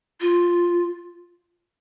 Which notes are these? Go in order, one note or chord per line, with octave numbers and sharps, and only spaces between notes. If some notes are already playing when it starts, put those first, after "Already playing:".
F4